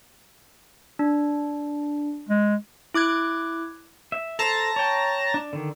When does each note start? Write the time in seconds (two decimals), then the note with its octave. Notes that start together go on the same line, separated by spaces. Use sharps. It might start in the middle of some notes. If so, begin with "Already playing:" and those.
0.99 D4
2.29 G#3
2.94 E4 D6 F#6 G#6
4.12 E5
4.39 A4 C5 A5 A#5 A#6
4.76 C#5 G5
5.34 D4
5.53 D3 D#3